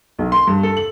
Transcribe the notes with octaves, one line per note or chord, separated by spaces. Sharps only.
B1
C6
G2
A4
F#7